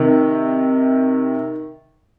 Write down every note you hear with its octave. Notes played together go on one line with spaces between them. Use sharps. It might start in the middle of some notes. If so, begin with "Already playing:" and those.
Already playing: C3 D#3